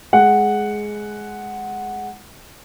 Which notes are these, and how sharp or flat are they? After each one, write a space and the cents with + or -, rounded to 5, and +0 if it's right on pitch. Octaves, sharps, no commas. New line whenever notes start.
G#3 +10 F#5 +0